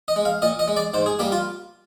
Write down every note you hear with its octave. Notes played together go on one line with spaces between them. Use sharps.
D#5
G#3
F5
A#2 D#5
D#5
G#3
D5
G#2 C5
G#4
G3 A#3 G4
F4